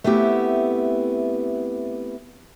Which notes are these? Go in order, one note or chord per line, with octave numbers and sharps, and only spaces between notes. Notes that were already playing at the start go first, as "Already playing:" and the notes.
A3 B3 C4 E4 G4